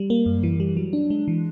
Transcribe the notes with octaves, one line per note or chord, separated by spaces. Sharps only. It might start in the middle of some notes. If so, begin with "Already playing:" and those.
Already playing: G3
A#3
F#2
E3
G3
F#3
D4
G#3
E3